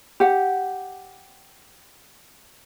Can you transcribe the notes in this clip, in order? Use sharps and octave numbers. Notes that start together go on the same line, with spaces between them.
G4 F#5